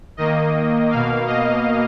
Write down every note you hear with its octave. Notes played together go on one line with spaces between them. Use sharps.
D#3 A#3 D#5
B2 A#3 F5
D#5